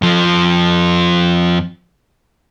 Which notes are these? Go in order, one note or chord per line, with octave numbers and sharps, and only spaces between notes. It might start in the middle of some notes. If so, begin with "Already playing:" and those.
F2 F3